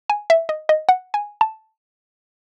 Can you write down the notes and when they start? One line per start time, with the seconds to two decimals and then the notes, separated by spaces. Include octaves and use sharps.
0.10 G#5
0.30 E5
0.49 D#5
0.69 D#5
0.89 F#5
1.14 G#5
1.41 A5